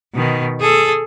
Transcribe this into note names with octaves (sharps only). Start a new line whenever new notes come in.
B2 D#3
G#4 A4